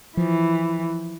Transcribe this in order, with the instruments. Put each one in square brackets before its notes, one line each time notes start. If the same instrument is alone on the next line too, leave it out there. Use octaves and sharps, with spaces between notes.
[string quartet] E3 [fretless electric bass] F3